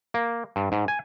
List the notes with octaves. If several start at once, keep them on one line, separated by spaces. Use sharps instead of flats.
A#3
G2
G#2
G#5